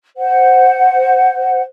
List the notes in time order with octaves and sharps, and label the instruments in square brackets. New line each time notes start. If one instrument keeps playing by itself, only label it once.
[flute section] C5 F#5